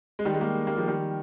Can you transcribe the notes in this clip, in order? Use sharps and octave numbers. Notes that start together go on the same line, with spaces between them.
G#3
D#3 G3
G#3
G3 A#3
G3 A#3
F3 G#3
D#3 G3